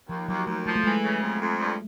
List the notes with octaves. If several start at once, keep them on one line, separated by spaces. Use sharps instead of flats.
D#2 F3
D#2 F#3
D#2 A3
F3 A3
A3
E3 G#3
C#3
F2
F2
G2